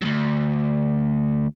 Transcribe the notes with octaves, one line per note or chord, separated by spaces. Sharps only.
D2 G2